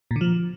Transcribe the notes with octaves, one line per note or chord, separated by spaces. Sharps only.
A#2
D3
F3